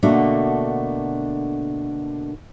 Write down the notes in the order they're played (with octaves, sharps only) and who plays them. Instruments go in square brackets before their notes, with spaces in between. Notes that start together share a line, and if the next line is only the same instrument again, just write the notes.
[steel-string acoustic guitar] B2 D3 A3 A#3 D4 F#4